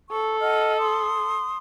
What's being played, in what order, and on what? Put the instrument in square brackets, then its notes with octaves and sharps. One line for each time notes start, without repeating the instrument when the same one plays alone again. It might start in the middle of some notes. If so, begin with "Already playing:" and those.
[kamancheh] A4 [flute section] C#6
[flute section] D#5 F#5 F6
C6 D#6